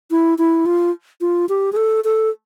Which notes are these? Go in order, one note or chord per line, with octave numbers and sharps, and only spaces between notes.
E4
E4
F4
F4
G4
G#4
A4
A4